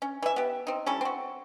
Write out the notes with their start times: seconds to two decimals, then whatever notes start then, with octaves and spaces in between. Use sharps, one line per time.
0.02 C#4
0.22 E3 E5
0.36 B3 G4
0.67 C4 D#4
0.86 G3 C#4 E4 A4
1.01 C4 F#4